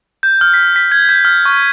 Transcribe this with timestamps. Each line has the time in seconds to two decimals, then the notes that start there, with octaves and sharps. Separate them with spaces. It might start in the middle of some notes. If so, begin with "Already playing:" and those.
0.23 G6
0.41 F6
0.54 B6
0.76 B6
0.92 G#6
1.09 G6
1.25 F6
1.45 C#6